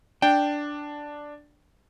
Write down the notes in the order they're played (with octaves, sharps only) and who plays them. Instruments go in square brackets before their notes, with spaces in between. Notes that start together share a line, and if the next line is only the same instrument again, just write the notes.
[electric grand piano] D4 [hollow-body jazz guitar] G5